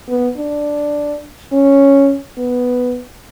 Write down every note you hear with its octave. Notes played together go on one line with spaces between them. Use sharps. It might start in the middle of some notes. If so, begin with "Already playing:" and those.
B3
D4
C#4
B3